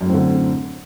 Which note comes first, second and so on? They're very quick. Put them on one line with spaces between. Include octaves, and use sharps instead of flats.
F#2 A2 C4 D3